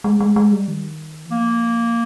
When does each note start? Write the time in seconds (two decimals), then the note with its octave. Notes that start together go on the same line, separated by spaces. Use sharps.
0.04 G#3
0.20 G#3
0.36 G#3
0.52 G3
0.68 D#3
1.25 E3
1.31 F3 A#3